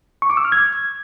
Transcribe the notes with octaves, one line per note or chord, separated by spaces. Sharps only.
C#6
D6
E6
F6
G#6